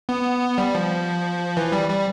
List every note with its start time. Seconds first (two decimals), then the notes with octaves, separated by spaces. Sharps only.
0.09 B3
0.58 G3
0.75 F3
1.57 E3
1.72 G3
1.89 G3